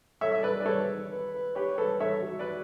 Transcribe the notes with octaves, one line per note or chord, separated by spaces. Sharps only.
A4 C#5 E5
E5
B4 D5
B4
D5
A4 C#5
B4
B4
G4 B4 C#5
A4 B4 C#5
A4 C#5 E5
F#4
B4 D5